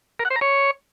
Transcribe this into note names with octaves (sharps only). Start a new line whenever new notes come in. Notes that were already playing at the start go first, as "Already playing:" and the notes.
A#4
F#5
C5
A#5
C#5